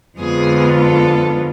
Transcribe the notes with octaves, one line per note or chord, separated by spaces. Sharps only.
F2 D3 G#3 B3 F4 G#4
A4